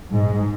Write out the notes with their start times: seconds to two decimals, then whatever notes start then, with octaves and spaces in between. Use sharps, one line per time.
0.11 G#2